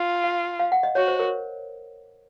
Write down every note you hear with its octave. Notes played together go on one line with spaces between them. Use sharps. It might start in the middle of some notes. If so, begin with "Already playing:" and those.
Already playing: F4
F5
F5
F#5
D#5
F#4 C#5
C5
A#4